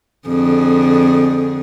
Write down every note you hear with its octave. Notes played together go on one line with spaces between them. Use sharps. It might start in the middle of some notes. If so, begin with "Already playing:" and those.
F2 D3 G#4